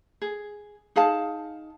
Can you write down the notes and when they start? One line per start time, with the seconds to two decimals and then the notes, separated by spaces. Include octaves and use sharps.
0.22 G#4
0.96 D#4 G#4 F5 A5